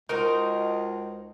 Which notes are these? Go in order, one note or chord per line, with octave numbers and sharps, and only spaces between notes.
C#2 D#4 F#4 A#4 C5